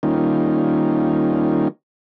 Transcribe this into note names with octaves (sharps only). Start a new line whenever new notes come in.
D#3 G3 A#3 C#4 D#4 F4